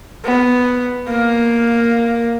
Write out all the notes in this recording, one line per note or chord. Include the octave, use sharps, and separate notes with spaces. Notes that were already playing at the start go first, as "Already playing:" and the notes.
B3
A#3